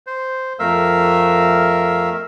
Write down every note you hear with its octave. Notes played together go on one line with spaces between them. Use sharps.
C5
F2 A3 A#4 E5 F5 E6